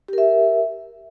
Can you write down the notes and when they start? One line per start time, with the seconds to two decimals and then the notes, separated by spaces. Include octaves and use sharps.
0.08 G4
0.13 A#4
0.18 E5